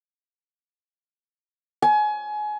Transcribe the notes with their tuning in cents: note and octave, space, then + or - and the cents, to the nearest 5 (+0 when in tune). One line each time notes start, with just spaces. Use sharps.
G#5 +25